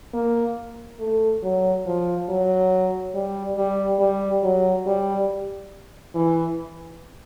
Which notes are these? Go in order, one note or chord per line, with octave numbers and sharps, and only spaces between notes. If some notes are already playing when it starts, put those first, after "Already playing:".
A#3
A3
F#3
F3
F#3
G3
G3
G3
F#3
G3
E3